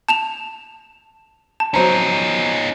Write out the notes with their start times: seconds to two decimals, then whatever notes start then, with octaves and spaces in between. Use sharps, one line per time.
0.09 A5 E7 F7
1.60 A5
1.74 F#3 C#4 D#4 C5 A#5